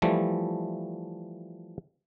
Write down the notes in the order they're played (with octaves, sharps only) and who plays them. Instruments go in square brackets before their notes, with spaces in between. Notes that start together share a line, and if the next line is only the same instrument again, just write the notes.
[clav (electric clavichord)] E3 F3 G3 A3